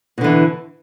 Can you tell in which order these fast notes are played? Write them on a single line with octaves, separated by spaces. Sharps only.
B2 D3 E3